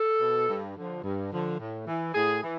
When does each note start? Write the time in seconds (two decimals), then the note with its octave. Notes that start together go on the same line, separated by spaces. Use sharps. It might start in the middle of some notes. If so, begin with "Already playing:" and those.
Already playing: A4
0.20 B2
0.48 G2
0.76 D3 F3
1.03 G2
1.31 D3 F3
1.58 A2
1.87 E3
2.14 A2 G#4
2.42 E3